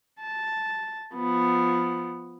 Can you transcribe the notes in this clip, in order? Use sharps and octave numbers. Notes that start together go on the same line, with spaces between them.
A5
F3 B3